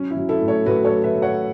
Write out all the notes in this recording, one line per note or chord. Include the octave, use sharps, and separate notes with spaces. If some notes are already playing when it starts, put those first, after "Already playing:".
Already playing: F#3 C#4
E4
F#3
E4 A4
A2
A4 C#5
A2 F#4 B4
A4 C#5
F#3
B4 E5
F#3
C#5 F#5